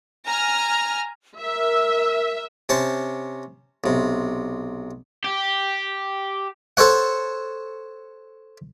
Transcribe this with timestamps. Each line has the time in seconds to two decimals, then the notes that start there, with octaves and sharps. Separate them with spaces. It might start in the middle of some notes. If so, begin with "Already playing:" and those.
0.24 G#5 A#5 F6
1.38 A#4 E5
2.69 C3 C#4 C5 A5
3.84 B1 C3
5.24 G4
6.77 A4 C5 C#5 F#5